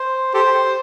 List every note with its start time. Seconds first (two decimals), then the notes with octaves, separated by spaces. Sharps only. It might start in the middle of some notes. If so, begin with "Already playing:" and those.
Already playing: C5
0.34 G4 A4 C5